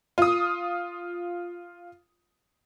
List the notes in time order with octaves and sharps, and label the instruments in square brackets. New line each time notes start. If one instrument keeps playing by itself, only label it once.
[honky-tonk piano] F4 D#6